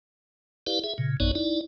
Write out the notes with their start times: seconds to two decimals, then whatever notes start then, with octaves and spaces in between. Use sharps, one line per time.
0.67 E4 G4 B4 D5 F5
0.84 G#4 E5
0.98 A#2 C#3
1.20 A1 F#2 B3 D#4 C#5 D5
1.35 D#4 E4 D5